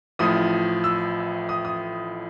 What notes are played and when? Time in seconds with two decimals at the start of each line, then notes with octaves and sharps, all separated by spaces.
0.19 A1 A2 F3 D#6
0.84 E6
1.49 D#6
1.65 D#6